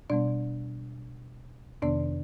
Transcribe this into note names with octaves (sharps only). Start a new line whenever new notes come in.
B2 G3 B3 D4 D5
F2 C3 D#3 B3 D4 D5